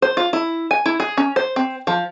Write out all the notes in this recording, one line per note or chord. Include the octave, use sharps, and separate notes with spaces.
C5
F4
E4
G#5
E4
G#4
C#4
C5
C4
F3